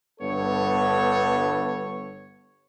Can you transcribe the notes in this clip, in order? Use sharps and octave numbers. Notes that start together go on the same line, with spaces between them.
G1 G2 B3 A4 C#5